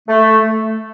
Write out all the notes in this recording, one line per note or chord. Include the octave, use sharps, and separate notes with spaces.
A3